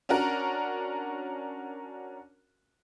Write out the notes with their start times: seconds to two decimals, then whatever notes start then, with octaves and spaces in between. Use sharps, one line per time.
0.09 C#4 D4 F#4 A#4